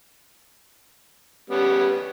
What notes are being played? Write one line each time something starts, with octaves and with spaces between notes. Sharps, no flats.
G3 B3 C#4